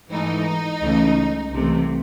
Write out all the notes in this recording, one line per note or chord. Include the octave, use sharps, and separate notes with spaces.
G#2 E3 A3 D#4
C#2 C#3 E3 A3
C2 C3 E3 A3